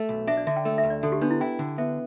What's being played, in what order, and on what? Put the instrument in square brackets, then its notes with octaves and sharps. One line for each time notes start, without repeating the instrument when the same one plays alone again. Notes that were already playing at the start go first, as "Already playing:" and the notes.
Already playing: [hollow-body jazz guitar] A3
B1
[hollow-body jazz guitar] D4 [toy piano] E5
[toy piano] D5
[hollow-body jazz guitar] D3 [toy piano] E5
[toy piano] G5
[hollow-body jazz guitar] A3
[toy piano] E5
[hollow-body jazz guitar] D2
[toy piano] D5
[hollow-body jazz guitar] D3 [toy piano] A4
[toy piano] G4
[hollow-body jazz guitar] B3 [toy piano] D4
[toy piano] E4
[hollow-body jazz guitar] E4 [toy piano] G5
[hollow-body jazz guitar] D3
[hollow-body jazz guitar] B3 [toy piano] E5